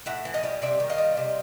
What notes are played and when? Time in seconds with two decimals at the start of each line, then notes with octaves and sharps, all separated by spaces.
0.06 A2 E5 F#5
0.25 E3
0.34 D#5 F5
0.43 G3
0.62 C3 D5 E5
0.80 D#3
0.90 D#5 F5
0.98 G3
1.17 C3